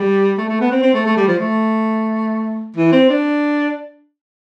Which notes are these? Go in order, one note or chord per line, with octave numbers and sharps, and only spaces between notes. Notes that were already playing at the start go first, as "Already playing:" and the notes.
Already playing: G3
A3
A3
B3
C4
C4
A3
A3
G3
F3
A3
E3
C4
D4